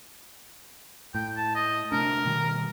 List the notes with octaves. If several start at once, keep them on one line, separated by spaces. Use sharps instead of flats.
A2 G5
A5
D#5
C3 A3 D4 A#4
B2 D#3 G3